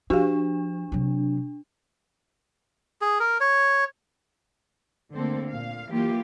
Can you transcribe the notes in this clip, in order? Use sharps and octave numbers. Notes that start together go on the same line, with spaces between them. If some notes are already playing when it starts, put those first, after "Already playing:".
F3 D4 F#4 G4 F5
C3 F#3
G#4
A#4
C#5
D2 D3 A#3 C4 A4 C5
A#2 F5
E3 F#3 A#3 F4 G4